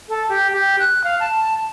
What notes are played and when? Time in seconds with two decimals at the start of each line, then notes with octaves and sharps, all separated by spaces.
0.09 A4
0.29 G4
0.53 G4
0.79 F#6
1.04 F5
1.20 A5